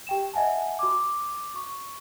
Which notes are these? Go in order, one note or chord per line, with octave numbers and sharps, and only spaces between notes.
G4 G5 E7
D#5 E5 F#5 G#5 A5
F#4 D6
C#6